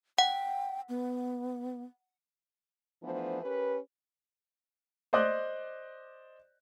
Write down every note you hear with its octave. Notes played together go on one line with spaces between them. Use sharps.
F#5 G5
B3
E3 F3 A3 B3 D4 C5
C#4 G4 A#4 B4
C5 D5 D#5 D6 F#6 G6